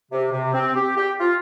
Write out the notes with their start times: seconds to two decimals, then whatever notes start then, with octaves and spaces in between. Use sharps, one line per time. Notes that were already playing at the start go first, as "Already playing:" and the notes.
0.11 C3
0.32 C3
0.54 C4
0.76 G4
0.96 G4
1.20 F4